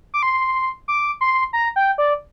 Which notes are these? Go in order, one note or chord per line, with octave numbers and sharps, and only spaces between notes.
D6
C6
D6
C6
A#5
G5
D5